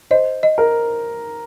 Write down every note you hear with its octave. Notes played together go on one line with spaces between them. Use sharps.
C5 D#5
D#5
A#4